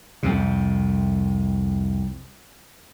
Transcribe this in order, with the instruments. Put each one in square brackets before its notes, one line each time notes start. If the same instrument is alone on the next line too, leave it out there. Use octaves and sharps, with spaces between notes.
[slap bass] C2 F2 C3